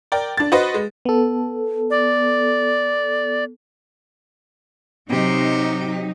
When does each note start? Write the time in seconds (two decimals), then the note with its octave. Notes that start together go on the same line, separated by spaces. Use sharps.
0.12 A#4 D5 G5
0.37 D4 A6
0.52 F#4 B4 C5 D#5
0.74 G#3
1.05 B3 A4
1.90 D5
5.09 C3 F#3 D#4 G4